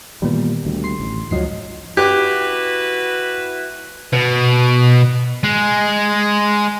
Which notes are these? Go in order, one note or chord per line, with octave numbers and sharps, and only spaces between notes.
A#2 D#3 E3 G3 B3
D2 G3
C6 C7
A1
D2 G#2 F3 F#3 D#5 C7
E4 F#4 G4 B4
B2
G#3